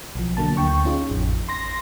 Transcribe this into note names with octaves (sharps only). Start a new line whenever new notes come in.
B1 F3
D3 F#3 A#3 A5
D2 G5 C#6
C#4 D#4 F4 G#4
A1 F2
C6 A#6